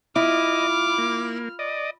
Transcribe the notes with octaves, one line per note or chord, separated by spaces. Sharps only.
E4 F4 D#5 D6 F6
A#3
D5 D#5